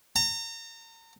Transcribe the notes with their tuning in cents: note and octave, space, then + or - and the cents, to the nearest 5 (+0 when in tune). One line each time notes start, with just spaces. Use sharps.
A#5 -35